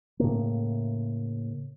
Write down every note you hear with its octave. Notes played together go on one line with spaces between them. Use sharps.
A2 C#3 A#3